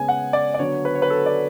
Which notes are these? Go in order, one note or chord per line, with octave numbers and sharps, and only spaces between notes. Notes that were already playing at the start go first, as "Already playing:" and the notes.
Already playing: C#3 G#3 B3 G#5
F#5
D5
D5
D3 F#3 B3 C#5
B4
C#5
B4
A4
D5